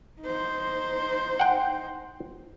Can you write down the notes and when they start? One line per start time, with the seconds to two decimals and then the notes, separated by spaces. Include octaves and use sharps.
0.21 D#4 C5
1.39 F#5 G5